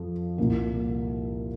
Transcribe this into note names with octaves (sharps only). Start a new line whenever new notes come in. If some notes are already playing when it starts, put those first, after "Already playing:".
Already playing: F2 F3
C2 A#2 A#3